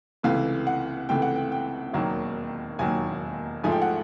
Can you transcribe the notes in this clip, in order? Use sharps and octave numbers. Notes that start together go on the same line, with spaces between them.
C#2 C3 E3 A3 F5
F#5
C#2 C3 E3 A3 G5
F#5
G5
G5
E1 D#2 D#3 F#3 A#3
E1 D#2 D#3 F#3 A#3 G#5
A1 G#2 F3 A3 G#5
G5
F#5